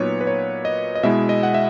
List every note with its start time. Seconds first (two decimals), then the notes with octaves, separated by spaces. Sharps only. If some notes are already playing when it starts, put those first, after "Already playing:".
Already playing: A#2 F#3 B3 D#4 B4 C#5
0.21 B4
0.27 C#5
0.65 D#5
0.95 D#5
1.03 B2 G#3 B3 E4 E5
1.29 D#5
1.43 F#5
1.54 E5